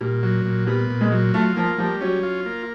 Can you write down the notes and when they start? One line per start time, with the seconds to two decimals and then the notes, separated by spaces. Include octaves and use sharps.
0.01 A#2 G3
0.23 F#3
0.45 A#2
0.67 G3 B3
0.90 A#2
1.01 G#3
1.12 F#3
1.34 A3 F4
1.56 F3 A#3
1.78 F3 G3
2.01 F#3 C#4
2.23 F4
2.46 A#3